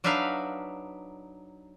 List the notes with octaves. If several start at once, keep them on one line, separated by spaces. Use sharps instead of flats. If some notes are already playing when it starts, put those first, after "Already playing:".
F#3 D4 D#4 B4 E5 F5